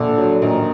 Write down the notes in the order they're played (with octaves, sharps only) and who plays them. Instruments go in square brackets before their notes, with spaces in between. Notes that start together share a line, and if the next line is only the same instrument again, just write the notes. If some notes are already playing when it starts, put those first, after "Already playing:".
Already playing: [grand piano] A#1 [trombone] D3
[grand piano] F#3
[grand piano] A#1 [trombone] D#3